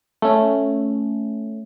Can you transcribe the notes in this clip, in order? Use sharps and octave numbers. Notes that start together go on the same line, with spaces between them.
A3 C#4